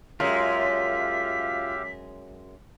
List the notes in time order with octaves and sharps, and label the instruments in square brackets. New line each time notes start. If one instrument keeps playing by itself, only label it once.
[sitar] F#2 G#3 [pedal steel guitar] F4 [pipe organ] G4 E5 F5 [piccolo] B6